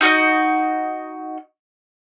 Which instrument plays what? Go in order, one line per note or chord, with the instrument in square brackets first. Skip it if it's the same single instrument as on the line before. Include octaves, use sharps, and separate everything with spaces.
[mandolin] D#4 F#4 D5 D#5